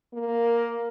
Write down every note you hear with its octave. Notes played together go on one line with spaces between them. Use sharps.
A#3